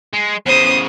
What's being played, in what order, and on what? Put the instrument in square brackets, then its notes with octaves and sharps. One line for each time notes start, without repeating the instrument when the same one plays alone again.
[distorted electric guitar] G#3
[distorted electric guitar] E2 C#3 [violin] C5 D#6